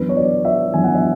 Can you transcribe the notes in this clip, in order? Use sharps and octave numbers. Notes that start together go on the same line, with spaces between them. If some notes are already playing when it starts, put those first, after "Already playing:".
Already playing: F#2 E3 B3 D4 B4
C#5
D5
E5
F#2 E3 B3 D4 G#5
F#5
E5